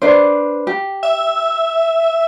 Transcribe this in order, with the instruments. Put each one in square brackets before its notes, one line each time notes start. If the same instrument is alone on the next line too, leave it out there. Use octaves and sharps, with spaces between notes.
[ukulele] D4 B4 C5
G4
[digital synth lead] E5